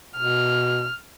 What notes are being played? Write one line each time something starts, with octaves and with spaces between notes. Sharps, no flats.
B2 F6